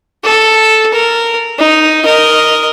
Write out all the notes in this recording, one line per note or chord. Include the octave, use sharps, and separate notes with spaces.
A4
A#4
D#4
A#4 D#5